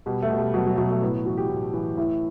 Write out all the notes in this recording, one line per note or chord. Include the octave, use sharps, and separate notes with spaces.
B2 G3
A3
B2
G3
B2 F#3
F#3
B2 F#3
A3
A2 B3
E3 F#4
G4
A2
E3
A2 E4